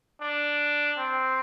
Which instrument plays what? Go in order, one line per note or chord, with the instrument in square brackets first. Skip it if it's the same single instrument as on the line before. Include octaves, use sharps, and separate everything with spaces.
[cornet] D4
C4